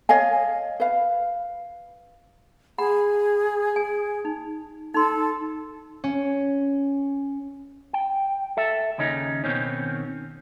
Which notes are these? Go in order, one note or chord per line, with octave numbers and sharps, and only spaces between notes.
C#5 D#5 F5 G#5
B4 F5
G#4 F#5 A#5 B5
G#5
D#4
D#4 A4 C6
C#4
G5
A4 E5
D#2 C#3 C#4 D#4
B2 D#3 C4 C#4